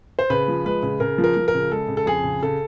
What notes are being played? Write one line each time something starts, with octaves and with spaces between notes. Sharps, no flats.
C5
C#3 B4
F3
G#3 B4
C#3
C#3 A#4
F3
A#4
F3
A#4
C#3
G#3 A4
C#3
A4
F2 G#4
C#3
C#3 A4